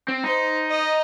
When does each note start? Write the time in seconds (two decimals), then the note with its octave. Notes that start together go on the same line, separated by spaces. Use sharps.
0.08 C4
0.24 D#4 C5
0.70 D#5